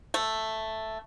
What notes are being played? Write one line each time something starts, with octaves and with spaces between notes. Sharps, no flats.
A3